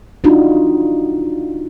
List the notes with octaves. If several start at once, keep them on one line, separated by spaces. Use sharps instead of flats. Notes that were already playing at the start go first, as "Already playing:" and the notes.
D4 D#4 F4 F#4